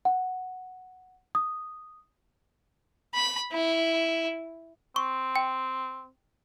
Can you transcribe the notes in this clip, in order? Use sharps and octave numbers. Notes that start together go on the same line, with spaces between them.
F#5
D#6
B5
E4
C4 C#6
G5